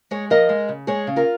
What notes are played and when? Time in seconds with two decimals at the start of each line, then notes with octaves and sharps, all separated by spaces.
0.11 G#3 G#4 C#5
0.30 F3 A#4 D#5
0.49 G#3
0.69 C#3
0.87 G#3 G#4 C#5
1.07 C#3
1.16 F4 A#4